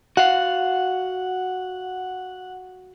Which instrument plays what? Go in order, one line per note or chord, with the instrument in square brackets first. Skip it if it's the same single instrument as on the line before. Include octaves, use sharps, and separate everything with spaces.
[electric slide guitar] F#4 F5 [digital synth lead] F#5